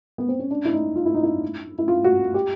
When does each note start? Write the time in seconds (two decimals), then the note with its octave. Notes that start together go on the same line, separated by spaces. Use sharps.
0.18 B3
0.29 C4
0.39 C#4
0.51 D4
0.65 E4
0.73 D#4
0.96 F4
1.06 E4
1.14 D#4
1.23 E4
1.78 E4
1.88 F4
2.04 F#4
2.34 G4